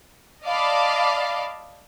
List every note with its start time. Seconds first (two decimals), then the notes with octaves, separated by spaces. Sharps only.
0.45 D5 D#5 F5 A5 B5 D6